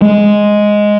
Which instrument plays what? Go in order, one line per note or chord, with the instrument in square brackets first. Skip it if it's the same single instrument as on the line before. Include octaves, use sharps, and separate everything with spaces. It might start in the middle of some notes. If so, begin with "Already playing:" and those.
[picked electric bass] G#3